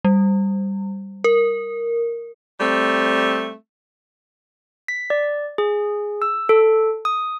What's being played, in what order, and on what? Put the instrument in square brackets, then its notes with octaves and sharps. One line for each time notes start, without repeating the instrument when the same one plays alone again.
[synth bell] G3
A#4
[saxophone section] G3 A3 C4
[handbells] B6
D5
G#4
E6
A4
D#6